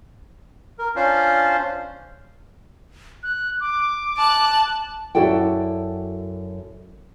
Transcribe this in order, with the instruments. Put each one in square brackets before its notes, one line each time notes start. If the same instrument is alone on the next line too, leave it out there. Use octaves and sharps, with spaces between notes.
[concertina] A#4
C#4 D4 F4 C5
[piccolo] F#6
D6
[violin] A5 F#6
[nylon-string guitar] F#2 E4 F#4 A4 D5 G5